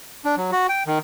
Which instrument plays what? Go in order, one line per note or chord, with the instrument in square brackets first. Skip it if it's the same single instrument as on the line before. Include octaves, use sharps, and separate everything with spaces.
[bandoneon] D4
F#3
F#4
G5
D#3